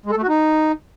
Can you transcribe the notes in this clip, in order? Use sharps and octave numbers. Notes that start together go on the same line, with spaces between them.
G#3
A4
A3
F#4
D#4